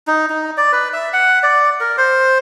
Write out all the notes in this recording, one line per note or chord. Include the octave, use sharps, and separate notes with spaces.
D#4
D#4
D5
B4
E5
F#5
D5
A#4
C5